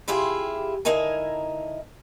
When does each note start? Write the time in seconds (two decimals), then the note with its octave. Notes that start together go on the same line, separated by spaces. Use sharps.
0.08 C3 E4 F4 G4 G#4
0.85 D3 D#4 E4 A#4 G#5